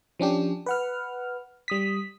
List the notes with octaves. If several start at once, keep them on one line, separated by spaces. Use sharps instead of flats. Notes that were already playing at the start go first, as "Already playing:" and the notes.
F3 C#4 D4 G4
B4 F#5 F6
G3 D#6 B6